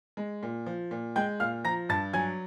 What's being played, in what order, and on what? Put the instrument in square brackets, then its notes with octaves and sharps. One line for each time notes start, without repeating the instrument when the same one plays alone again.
[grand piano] G#3
A#2
F3
A#2
G#3 G5 G6
A#2 F5 F6
F3 A#5 A#6
G2 A5 A6
F#3 G#5 G#6